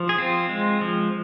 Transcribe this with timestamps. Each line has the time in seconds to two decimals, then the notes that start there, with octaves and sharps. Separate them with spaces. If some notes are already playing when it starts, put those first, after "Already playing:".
Already playing: F3
0.09 G#4
0.18 C4 F4
0.49 G#3
0.81 F3